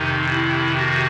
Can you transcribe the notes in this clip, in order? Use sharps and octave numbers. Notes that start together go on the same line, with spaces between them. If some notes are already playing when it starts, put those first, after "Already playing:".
Already playing: F2 C3 D#3 D#4
E4
F#4